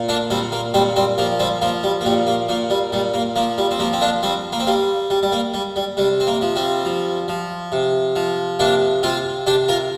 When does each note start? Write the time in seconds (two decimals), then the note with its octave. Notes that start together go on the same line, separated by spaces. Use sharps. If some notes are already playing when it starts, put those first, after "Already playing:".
Already playing: A#2
0.09 A#3 D4
0.30 A#2 G3 C4
0.52 A#3
0.74 A#2 G3 C4
0.96 G3 C4
1.18 F3 A#3
1.40 G3 C4
1.62 F3 A#3
1.83 G3
2.01 A#3
2.05 A#2 G3
2.27 A#3
2.49 A#2 A#3
2.70 G3
2.92 A#2 G3
3.14 A#3
3.36 F3 A#3
3.58 G3
3.71 C4
3.80 F3 A#3
3.93 C4
4.01 A#3 D4
4.23 G3 C4
4.52 A#3
4.60 C4
4.67 G3 A#3
5.10 G3
5.23 G3
5.32 A#3
5.54 G3
5.76 G3
5.97 C3 G3
6.20 C4
6.27 A#3
6.42 F3
6.56 G3 C4
6.85 F3
7.28 F3
7.72 C3
8.16 F3
8.59 C3 A#3 D4
9.03 C3 C4 F4
9.47 C3 D4 G4
9.68 F4 A#4